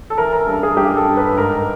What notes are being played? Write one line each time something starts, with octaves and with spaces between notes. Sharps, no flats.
A4
E3 A#4
A#4
G2 A4
G#4
G2 G4
A4
G2
B4
G#2 A#4